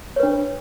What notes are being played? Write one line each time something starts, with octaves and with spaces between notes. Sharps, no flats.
D4 B4 C#5